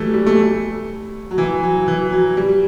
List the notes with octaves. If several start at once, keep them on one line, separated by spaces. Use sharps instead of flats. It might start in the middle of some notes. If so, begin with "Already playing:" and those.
Already playing: E3 F#3 G3 A3
G3
A3
F#3
E3
F#3
E3
F#3
G3